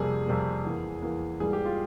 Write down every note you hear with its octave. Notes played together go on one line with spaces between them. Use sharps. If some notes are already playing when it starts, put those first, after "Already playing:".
Already playing: F2 C3 G3 A#3 G#4
F2 C3 G3 A#3
E2 E3 A#3
E2 E3 A#3
G#2 E3 G3 A#3 G#4
G4
F4